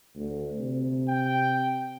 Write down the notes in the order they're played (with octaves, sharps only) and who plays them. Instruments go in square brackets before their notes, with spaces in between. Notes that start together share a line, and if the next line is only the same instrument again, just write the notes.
[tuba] D2
C3
[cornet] G5